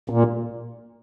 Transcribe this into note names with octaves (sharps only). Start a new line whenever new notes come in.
A#2